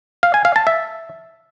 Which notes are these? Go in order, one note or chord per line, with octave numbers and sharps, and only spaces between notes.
F5
G#5
F5
A5
E5